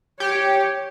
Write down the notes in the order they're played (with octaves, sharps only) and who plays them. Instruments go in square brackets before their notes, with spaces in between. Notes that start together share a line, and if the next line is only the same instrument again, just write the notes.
[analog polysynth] G4 [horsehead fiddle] C#5